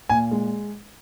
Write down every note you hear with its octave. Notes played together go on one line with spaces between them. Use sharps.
A#2 G#5
G#3